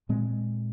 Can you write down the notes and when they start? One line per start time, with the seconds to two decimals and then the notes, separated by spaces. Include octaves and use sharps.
0.09 A#2 G#3 C4